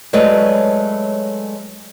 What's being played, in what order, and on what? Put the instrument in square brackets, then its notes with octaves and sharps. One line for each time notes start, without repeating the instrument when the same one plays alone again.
[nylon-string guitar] F#3 G#3 A3 B4 C#5 D5